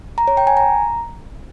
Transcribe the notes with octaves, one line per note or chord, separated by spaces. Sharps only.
A#5
C#5
G5
G#5
A#5